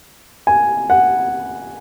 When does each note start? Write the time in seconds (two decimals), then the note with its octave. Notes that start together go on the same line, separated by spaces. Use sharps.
0.47 G#5
0.90 F#5